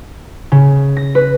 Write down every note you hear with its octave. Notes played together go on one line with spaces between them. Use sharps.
C#3
A#6
B4